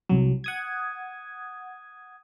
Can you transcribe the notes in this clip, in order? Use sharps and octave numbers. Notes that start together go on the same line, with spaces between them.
C2 F#3
F#5 D#6 G#6